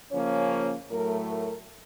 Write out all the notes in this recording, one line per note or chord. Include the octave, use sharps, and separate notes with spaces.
C#3 F3 A#3 C#4 C#5
A2 F#3 A3 A#4
A#4